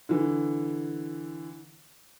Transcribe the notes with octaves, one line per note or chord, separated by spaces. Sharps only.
D3 E3